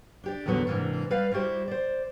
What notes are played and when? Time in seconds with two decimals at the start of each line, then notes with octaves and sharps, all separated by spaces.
0.24 D4 G4 D5
0.46 E2 A2 D3 F#3 B3 D#4
0.67 G#2 C3 E3 A#3 D4
1.10 G3 B4 D5 F5
1.32 G3 E4 F#4 G4 C5
1.68 C5 D5